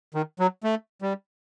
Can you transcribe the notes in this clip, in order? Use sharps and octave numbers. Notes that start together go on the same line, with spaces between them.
D#3
F#3
A3
G3